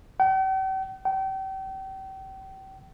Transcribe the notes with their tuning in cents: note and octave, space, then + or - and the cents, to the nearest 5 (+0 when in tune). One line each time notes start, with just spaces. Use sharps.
G5 -45
G5 -35